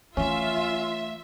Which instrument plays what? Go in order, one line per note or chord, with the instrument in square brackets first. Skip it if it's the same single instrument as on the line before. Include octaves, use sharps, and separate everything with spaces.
[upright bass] E3 A3 [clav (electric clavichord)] C#4 [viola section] F4 [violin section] E5